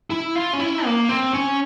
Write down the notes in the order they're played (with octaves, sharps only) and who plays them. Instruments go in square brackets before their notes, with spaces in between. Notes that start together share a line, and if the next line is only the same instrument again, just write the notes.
[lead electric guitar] E4
F4
C#4
E4
A#3
C4
C#4